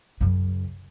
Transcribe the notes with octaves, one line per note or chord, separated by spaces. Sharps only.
F#2 C#3